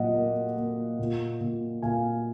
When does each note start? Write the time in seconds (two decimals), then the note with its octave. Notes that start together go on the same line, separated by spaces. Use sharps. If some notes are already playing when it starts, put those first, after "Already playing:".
Already playing: A#2 F#3 D#5 F#5
0.14 A#3
0.57 A#3
0.99 A#2
1.41 A#2
1.82 A#2 F5 G#5